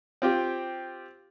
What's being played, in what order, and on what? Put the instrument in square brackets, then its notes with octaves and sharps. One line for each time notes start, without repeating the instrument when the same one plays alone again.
[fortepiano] C4 F4 G4